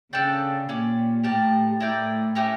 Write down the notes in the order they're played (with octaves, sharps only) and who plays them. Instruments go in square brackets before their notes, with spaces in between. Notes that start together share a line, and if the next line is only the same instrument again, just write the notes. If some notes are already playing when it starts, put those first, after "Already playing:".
[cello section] C#3 [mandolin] D4 A4 D5 G5
[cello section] A#2 [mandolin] C#4 G4 D5
[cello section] A2 [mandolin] G4 A#4 D5 A5
[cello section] A2 [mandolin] E4 A#4 D5 G5
[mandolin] A3 C#4 G4 A#4